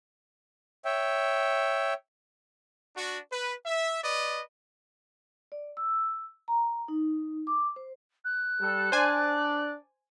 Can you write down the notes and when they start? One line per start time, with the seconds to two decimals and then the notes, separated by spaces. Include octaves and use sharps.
0.85 C#5 E5 G5
2.96 D4 F#4
3.32 B4
3.66 E5
4.04 B4 D5 D#5
5.52 D5
5.77 E6
6.48 A#5
6.88 D#4
7.47 D6
7.76 C5
8.24 F#6
8.61 G3 A4
8.92 D4 C5 D5 G#5